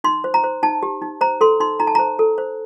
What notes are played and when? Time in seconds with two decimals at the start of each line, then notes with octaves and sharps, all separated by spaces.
0.04 D#4 C6
0.24 C5
0.34 A#5
0.44 C5
0.63 D#4 A5
0.83 G4
1.02 D#4
1.21 C5 A#5
1.41 A4 C6
1.60 D#4 C6
1.80 D#4 A#5
1.87 A5
1.95 C5 A#5
2.19 A4
2.38 C5